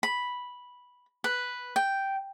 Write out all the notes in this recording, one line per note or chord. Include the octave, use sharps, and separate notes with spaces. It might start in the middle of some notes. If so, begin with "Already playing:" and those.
B5
B4
G5